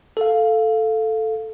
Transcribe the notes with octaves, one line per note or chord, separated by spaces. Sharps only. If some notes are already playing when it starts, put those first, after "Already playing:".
A4 F5